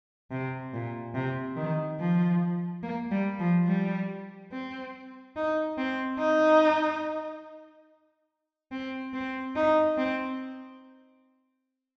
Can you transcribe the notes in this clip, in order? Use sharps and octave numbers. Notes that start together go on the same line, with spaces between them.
C3
A#2
C3
D#3
F3
A#3
G3
F3
G3
C4
D#4
C4
D#4
C4
C4
D#4
C4